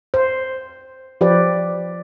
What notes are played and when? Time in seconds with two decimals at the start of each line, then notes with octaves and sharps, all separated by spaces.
0.14 C5
1.21 F3 G4 B4 D5